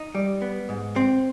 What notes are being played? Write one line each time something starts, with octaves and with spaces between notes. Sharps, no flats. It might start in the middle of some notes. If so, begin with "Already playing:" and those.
Already playing: D#4
G3
B3
G#2
C4